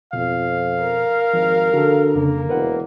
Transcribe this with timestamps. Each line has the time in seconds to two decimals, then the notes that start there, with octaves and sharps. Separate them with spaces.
0.13 F2 B2 F5
0.81 A#4
1.33 G#1 F3
1.73 D3 F#4 A4
2.15 F2 C#3 A#3
2.49 E1 A#4 B4 F#5